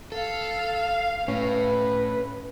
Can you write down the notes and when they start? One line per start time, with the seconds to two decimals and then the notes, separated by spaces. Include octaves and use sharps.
0.12 A4 F5
1.28 A2 C#4 B4